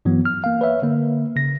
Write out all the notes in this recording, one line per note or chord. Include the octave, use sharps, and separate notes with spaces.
G2 E3 F#3 B3
F6
A#3 F5
B4 C#5 E5
D3 A#3
C#3 A#6